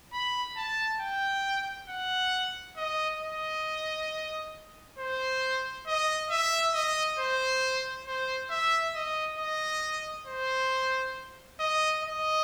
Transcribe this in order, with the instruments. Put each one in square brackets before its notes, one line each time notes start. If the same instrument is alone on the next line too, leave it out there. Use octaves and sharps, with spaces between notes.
[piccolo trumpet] B5
A5
G5
F#5
D#5
D#5
C5
D#5
E5
D#5
C5
C5
E5
D#5
D#5
C5
D#5
D#5